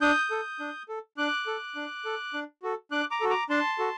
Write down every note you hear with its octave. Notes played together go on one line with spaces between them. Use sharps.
D4 D#6 G6
A4
D4
A4
D4 D6 F#6
A4
D4
A4
D4
F#4 A4
D4 D6 F#6
A#5 D6
F#4 A4
A#5 D6
D4 A5 C6
F#4 A4